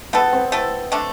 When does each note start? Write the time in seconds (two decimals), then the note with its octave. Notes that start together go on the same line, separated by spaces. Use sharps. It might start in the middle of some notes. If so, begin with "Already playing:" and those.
0.13 A3 B3 E4 A4
0.32 C4
0.52 A3 E4 A4
0.92 D3 A3 D4